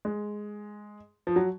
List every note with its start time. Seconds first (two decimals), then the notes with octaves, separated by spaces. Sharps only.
0.05 G#3
1.27 F3
1.36 F#3